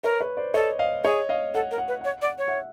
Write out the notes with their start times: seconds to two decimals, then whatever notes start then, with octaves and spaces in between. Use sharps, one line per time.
0.03 A#4 B4 C#5
0.21 B4 C#5
0.37 C5 D5
0.54 A4 C#5 D#5
0.79 D#5 F5
1.04 G#4 C#5 D#5
1.29 D#5 F5
1.55 A4 F#5
1.71 A#4
1.78 F#5
1.88 B4
2.01 C#5 F#5
2.22 D5
2.25 F#5
2.38 C#5
2.48 E5 F#5